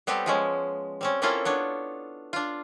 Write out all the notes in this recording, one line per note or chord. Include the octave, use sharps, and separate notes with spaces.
G3 B3 C4 G4 A4
F3 G#3 C#4
G3 C4 C#4
A#3 C4 C#4 E4 F4 A4
B3 D4 C#5
D4 F4